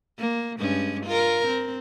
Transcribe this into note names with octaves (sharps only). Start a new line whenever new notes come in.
A#3
G2 G#3 C#4
F4 A#4
C4